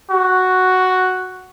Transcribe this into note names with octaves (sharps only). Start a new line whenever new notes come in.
F#4